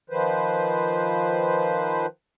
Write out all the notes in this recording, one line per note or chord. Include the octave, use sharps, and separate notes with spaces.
D#3 F3 B4 C5